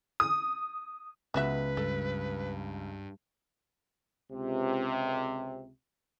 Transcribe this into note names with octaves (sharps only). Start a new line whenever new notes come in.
D#6
C#2 B3 F#4 B4 E5
G2 A4
C#2 C3